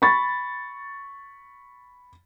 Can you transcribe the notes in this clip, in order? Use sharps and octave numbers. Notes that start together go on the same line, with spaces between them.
B5 C#6 A6